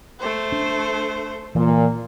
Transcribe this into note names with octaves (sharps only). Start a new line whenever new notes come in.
A3 C5
D4
A#2 E3